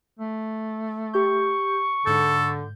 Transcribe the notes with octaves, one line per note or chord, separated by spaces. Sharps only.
A3
G4 C#6 G6
G#2 D3 A4 G6